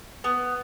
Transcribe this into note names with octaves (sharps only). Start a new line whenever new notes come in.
B3